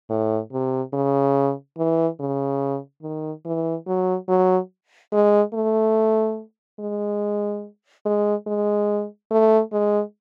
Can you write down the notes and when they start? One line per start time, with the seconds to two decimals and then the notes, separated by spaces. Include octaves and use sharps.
0.10 A2
0.53 C3
0.93 C#3
1.78 E3
2.20 C#3
3.02 D#3
3.45 E3
3.87 F#3
4.28 F#3
5.13 G#3
5.54 A3
6.79 G#3
8.05 G#3
8.47 G#3
9.31 A3
9.72 G#3